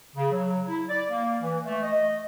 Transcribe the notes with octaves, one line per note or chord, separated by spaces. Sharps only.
C#3
F#3
E4
D5
A#3
E3
A3
D#5